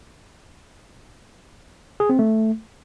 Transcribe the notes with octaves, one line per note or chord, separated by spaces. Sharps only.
G#4
C4
A3